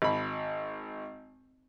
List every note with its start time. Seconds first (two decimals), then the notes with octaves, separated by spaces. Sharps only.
0.02 G#1 B5